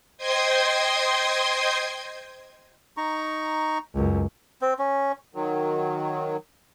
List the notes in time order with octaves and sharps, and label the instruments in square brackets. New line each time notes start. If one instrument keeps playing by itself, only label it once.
[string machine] C5 D#5 G5 C6 D#6 G#6
[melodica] D#4 A#5 C#6
[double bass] C#2 F#2
[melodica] C4
C#4
[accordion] D#3 F#3